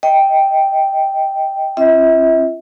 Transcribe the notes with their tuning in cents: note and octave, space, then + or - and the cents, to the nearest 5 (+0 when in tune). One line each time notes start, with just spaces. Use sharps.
D#5 +20 G5 +0
C#4 -45 F4 -45 E5 -40